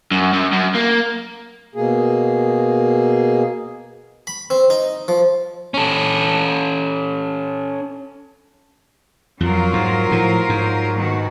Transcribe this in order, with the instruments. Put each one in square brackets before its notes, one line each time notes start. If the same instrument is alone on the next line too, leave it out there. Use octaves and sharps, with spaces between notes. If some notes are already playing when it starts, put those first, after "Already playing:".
[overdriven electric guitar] F#2
F#2
F#2
A#3
[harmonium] B2 A#3 G#4
[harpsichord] B5
C4
D#4
F3
[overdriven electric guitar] C#4 A4
[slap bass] F2 [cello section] F#3 F4 A#4
[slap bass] G#2
A2 F3
G#2
[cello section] B2 D#3 F#4